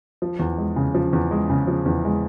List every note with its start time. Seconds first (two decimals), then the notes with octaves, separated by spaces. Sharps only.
0.22 F3
0.39 E2
0.58 G#3
0.76 C#3
0.95 F3
1.13 E2
1.31 G#3
1.50 C#3
1.67 F3
1.86 E2
2.05 G#3